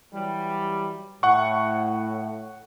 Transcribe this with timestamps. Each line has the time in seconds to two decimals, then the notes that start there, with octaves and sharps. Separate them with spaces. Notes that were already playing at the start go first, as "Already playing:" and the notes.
0.13 E3 F#3 G3
1.23 A2 F#5 C#6